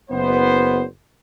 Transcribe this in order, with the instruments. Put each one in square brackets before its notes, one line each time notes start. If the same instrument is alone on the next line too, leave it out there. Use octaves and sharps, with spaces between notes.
[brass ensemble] F#1 B3 C5